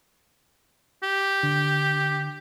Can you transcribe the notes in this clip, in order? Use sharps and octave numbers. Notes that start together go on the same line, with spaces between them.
G4
D3